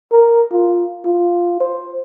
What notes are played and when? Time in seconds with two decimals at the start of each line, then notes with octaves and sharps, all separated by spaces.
0.12 A#4
0.52 F4
1.05 F4
1.60 C5